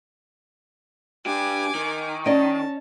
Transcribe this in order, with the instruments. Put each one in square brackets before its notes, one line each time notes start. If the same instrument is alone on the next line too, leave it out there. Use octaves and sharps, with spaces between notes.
[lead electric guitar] D4 G4 [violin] G#5 D6
[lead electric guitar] D#3
[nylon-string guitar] C#4 D#5 [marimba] D5 [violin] A5